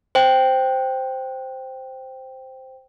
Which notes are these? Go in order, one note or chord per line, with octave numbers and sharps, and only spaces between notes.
C5 G5